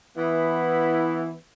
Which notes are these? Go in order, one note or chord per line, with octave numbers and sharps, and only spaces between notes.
E3 B3 E4